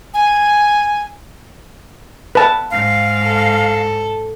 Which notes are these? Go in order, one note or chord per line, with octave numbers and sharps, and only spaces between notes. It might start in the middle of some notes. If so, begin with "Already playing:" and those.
G#5
B4 A5
G#2 F5
A4